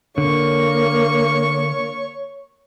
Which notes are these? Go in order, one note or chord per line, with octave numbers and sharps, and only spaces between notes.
D3 A#3 C#5 C#6